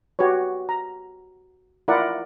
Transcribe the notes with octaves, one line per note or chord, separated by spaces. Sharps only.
F#4 G4 B4 C#5
A#5
E4 F4 A#4 D5 F#5